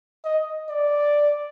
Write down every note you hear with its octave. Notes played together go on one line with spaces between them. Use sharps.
D#5
D5